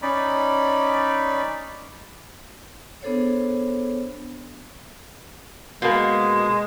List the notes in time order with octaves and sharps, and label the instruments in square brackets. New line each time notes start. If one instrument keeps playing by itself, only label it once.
[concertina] C#4 D#4 D5 B5
[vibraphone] B3 D4 G#4 A4 C5 C#5
[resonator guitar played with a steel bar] B2 A#3 [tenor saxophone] G#3